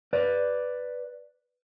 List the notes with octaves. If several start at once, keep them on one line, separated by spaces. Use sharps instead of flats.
B4 D5